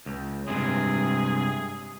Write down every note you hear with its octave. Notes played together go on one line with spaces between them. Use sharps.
C#2
G2 C3 G#3 G#4